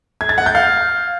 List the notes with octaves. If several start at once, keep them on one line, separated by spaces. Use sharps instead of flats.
G#6
A6
F#5
G6
F5